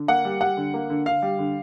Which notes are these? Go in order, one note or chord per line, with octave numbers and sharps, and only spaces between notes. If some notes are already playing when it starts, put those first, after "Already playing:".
Already playing: D3
A#3 F#5
G3
G3 F#5
D3
A#3
D3
D3 F5
G3
D3